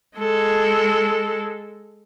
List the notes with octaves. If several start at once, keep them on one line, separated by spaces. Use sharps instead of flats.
G#3 A4